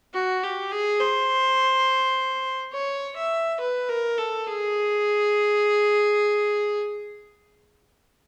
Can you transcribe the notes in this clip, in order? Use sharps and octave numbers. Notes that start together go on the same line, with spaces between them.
F#4
G4
G#4
C5
C#5
E5
B4
A#4
A4
G#4